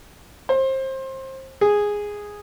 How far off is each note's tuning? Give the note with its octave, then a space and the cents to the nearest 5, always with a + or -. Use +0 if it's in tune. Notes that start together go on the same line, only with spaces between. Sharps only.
C5 +25
G#4 -5